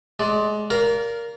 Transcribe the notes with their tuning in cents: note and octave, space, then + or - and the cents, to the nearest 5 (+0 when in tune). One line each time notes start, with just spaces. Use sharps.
G#3 +25 D5 +0
A#4 +0 D5 -35 F5 +0